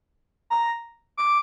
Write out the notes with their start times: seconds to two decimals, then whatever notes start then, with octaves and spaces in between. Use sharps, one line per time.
0.50 A#5
1.17 D6